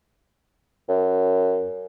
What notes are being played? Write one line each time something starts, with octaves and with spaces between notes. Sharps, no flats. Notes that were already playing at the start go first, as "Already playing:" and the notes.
F#2